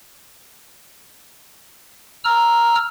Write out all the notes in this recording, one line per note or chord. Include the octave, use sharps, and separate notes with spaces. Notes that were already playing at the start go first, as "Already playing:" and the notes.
A#5 E6 F6